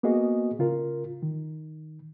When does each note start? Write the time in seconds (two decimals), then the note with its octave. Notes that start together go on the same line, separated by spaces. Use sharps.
0.03 A#3 B3 F#4 G#4 D#5
0.59 C#3 F4 A#4
1.23 D#3